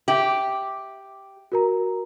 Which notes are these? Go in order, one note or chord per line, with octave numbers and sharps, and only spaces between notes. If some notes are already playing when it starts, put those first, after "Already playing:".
G4 E5 F#7
F#4 A#4 A#5